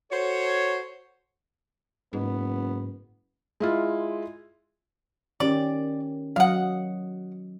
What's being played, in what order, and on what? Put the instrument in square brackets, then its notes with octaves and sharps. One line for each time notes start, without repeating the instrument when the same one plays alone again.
[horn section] F#4 A4 C5 C#5
[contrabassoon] F#1 [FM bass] G#2 [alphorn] B3
[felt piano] G#3 E4 F4
[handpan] D#3 C#4 G4 [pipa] D5
[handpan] F#3 D#5 [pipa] F5 F#5